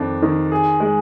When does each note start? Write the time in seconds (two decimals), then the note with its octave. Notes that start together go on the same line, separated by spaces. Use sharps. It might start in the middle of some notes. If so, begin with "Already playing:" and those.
Already playing: F2 D#3 D4
0.22 D#3
0.52 G#4
0.80 G#3